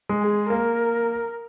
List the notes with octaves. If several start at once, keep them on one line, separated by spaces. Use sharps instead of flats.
G#3
G#4
A#3 A#4